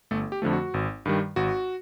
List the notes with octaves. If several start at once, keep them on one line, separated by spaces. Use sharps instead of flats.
G1 A3 A4
G4
F2 D3 F3 A3
F#4
G#1
G2 D#3 G3
G#1 F#4